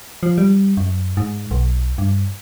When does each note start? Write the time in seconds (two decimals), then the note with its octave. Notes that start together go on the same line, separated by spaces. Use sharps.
0.23 F3
0.38 G3
0.77 F#2
1.17 G#2
1.51 B1
1.98 G2